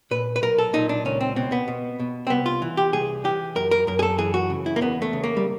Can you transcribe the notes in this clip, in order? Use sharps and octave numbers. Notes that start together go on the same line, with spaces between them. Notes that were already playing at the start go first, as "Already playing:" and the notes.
A#2 B4
B4
B1 A#4
A4
A#2 D#4
D4
C#2 C#4
C4
B2 C4
B3
B2
B2
C4
C2 B3
F4
E3
G4
C2 G#4
E3 G4
F#2 A#4
A#4
F#2 A#4
G#4
A4
E3 G#4
F#4
C#3
E4
A#3
E2 B3
A3
C#3
A#3
G3